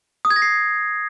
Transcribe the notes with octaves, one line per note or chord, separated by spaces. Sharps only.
D#6
G#6
A#6
C7